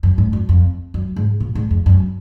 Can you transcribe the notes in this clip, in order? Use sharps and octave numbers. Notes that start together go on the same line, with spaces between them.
F#2
G#2
F#2
F2
F#2
G#2
A#2
G#2
F2
F#2